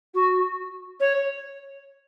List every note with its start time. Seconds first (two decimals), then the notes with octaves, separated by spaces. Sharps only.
0.14 F#4
1.00 C#5